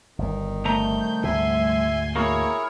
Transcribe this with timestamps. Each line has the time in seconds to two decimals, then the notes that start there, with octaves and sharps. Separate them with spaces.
0.18 G1 D#3
0.65 C2 A3 A#5 G6
1.23 D2 G#2 D3 E5 G#5 C6
2.16 A#3 E4 F#4 G#4 A#4 C#5